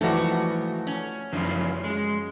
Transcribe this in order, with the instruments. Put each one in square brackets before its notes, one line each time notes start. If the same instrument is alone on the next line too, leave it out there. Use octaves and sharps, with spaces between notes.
[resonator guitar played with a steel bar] G#2 G3 F#4 [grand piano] E3 F3 A3
[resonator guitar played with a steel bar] C#4
[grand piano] F#2 [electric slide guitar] C#3 E3 F3
[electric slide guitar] G#3